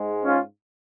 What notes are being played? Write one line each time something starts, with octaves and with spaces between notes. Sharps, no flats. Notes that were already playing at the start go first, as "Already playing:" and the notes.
Already playing: G#2 G#3
C#4 F4